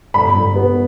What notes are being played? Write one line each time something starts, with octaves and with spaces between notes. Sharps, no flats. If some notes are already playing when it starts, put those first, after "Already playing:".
G1 B5
G1
B3